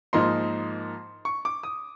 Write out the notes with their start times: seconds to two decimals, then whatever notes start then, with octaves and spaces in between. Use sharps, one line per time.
0.13 G#2 F3 A#3 D#4 C6
1.25 C#6
1.45 D6
1.63 D#6